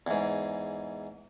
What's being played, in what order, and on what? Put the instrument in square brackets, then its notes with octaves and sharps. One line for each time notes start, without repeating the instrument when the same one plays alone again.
[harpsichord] E2 G#2